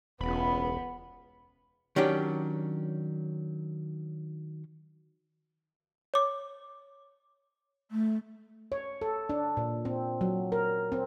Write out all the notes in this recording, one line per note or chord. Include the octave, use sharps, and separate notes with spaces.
E1 C#2 B3 B5
D#3 F#3 C#4 D4 G4
C#5 D6
A3
C#5
A4
D4
A#2
C4
F#3
A#4
C4